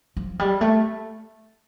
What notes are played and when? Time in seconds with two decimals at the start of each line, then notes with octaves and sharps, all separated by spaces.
0.17 F3
0.39 G3
0.61 A3